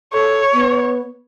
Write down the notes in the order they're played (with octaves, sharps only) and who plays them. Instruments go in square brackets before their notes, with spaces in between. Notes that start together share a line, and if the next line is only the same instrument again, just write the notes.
[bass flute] A4 [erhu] C#5
[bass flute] B3